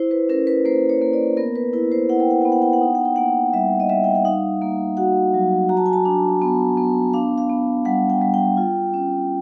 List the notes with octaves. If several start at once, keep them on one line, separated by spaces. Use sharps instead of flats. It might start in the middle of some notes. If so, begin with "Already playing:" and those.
Already playing: E4 C5
B4
C#4 A#4
B4
A#3 C5
C#5
A#3
D5
B3 A#4
B4
E4 B4
C5
E4 F#5
G5
F#5
B3 G5
F#5
G5
F#5
D#4 G5
F#5
G5
A#3 F#5
G3 E5
D#5
G3 E5
G5
F#5
D#4 F5
A#3
F#4 F#5
F#3
F#4 A#5
A5
G#5
A5
D4
B3
B3
D4 F5
F5
B3
G3 F#5
G5
G3
G5
F4
C#4